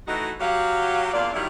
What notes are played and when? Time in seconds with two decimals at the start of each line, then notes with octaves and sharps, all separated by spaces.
0.07 E3 A3 D#4 F#4
0.40 F#3 G4 F5
1.13 E2 A#2 D4 F4 D5 F5
1.34 D#3 F#3 G3 E4